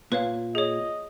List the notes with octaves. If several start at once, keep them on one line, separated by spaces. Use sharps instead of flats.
A#2 B4 C#5 F5
G#4 C#5 D#5